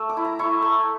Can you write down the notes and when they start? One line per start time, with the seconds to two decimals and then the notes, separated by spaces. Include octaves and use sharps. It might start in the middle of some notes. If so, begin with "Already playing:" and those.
Already playing: A3 E6
0.09 D6
0.17 E4
0.25 A#5
0.39 E4 C#6
0.62 A3